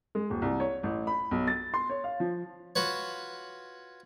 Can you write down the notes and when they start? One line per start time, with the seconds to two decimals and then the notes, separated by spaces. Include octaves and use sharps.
0.15 G#3
0.30 D#1
0.42 C2
0.60 C#5
0.83 A1
1.07 B5
1.31 B1
1.47 A6
1.74 C6
1.90 C#5
2.04 F5
2.20 F3
2.76 F4 F#4 B4 C#5